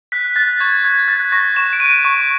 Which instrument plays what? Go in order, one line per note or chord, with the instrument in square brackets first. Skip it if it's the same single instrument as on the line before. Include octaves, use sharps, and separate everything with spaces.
[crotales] F#6 B6
F#6 A6
C#6 G#6
F#6 G#6
F#6 A6
C#6 A#6
C#6 E7
D7
F#6 D#7
C#6 D#7